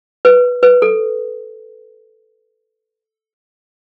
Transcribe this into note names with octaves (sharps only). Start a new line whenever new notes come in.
B4
B4
A4